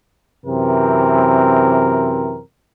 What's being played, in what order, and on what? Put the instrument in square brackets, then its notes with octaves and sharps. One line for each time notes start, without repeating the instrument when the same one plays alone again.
[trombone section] F#2 C3 E3 C4 A#4